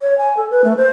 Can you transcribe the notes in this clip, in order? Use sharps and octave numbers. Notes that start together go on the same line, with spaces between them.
C#5
G#5
A4
B4
A3
C5